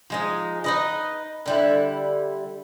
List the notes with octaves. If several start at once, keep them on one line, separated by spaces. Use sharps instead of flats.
F3 G#3 D#4
D#4 B4 D#5
D3 G3 E4